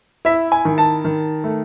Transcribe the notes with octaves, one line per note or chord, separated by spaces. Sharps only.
E4 E5
G#5
D#3
A5
D#3
A3